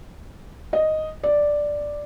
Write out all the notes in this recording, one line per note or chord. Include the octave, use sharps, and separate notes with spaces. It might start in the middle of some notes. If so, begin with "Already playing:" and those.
D#5
D5